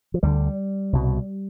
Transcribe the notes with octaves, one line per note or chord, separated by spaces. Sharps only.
F3
D2 D3 G3
C2 B2